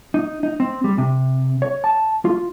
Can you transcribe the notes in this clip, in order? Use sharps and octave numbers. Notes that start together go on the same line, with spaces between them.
D#4
D#4
C4
G3
C3
C#5
A5
F4